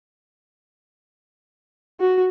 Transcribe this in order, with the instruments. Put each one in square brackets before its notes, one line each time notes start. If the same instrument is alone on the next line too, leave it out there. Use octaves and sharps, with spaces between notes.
[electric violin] F#4